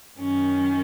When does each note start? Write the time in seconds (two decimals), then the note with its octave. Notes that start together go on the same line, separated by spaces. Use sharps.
0.18 F#2 D#3 C#4